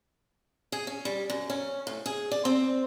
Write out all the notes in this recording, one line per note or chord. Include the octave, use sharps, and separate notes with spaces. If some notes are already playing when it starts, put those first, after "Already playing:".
G#4
C#4
G3
F#2
C#4
A2
G#4
D5
C4